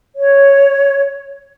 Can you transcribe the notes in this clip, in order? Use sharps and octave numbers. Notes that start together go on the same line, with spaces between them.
C#5